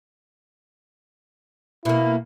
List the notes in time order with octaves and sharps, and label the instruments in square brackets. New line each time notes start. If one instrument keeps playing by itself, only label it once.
[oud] B2 A#3 [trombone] E4